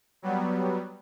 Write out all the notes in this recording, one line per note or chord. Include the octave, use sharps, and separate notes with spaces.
F#3 G3 B3